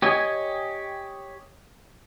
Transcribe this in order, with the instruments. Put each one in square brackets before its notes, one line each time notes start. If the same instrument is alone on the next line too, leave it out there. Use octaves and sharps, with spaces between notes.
[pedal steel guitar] G4 C#5 D#5 G#5